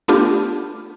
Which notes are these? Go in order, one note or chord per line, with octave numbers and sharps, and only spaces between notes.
A3 B3 D4 F4 G4